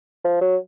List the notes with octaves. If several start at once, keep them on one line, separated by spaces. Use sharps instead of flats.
F3
F#3